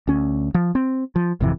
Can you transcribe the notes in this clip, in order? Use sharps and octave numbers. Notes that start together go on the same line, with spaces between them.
D2 C#4
F3
C4
F3
G#1 F2 C3 E3